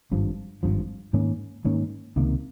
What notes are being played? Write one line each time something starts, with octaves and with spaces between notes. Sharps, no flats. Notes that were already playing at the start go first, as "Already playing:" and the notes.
G#1 G2 F3
G#1 G2 F3
G#2 D#3 A#3 C#4
G#2 D#3 A#3 C#4
C#2 C3 D#3 A#3